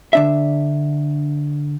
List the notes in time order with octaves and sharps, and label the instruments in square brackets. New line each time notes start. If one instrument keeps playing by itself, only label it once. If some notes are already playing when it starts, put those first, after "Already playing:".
[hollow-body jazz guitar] D3 D4 E5